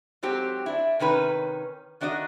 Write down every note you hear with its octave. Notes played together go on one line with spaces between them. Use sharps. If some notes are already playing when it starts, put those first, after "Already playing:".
G#2 F#3 C4 G4
D4 E4
C3 D#3 C#4 B4
D#3 D4 F#4 D5 D#5